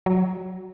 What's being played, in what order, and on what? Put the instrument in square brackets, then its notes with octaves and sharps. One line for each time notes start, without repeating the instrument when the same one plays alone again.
[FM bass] F#3